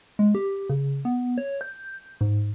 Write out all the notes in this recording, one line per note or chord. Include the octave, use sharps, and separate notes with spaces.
G#3
G4
C#3
B3
C#5
G6
G#2